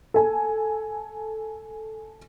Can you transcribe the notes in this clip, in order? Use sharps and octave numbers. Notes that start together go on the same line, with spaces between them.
A4 G#5